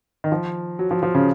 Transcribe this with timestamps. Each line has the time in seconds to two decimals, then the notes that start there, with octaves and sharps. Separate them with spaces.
0.24 D#3
0.32 F3
0.79 F#3
0.91 F3
1.03 F3
1.15 C#3